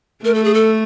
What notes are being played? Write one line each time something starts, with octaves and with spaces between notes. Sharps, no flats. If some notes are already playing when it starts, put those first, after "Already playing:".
A3 A#4
A4
G#4
A4